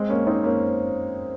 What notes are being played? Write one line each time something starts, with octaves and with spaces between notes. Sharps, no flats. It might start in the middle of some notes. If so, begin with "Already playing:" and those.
Already playing: G#3 C4
A#3 C#4
C4 D#4
A#3 C#4